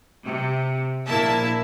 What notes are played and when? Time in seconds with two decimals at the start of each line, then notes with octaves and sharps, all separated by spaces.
0.24 C3
1.06 A#1 A#3 E4 E5 A5